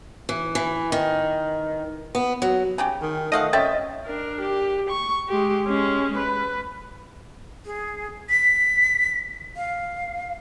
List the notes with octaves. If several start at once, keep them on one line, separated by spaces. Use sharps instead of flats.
E3
E3
D#3
B3
F#3
C#3 C#4 G4
D#3
F3 A3 D#5 F5 F#5
C4 C#4 E5 G5 A6
D4 A#4
G4
C#6
G#3 G4
G#3 C#4
B4
G#4
B6
F5